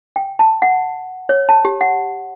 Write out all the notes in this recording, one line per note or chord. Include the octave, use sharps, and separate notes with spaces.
G5
A5
F#5
C#5
A5
G4
F#5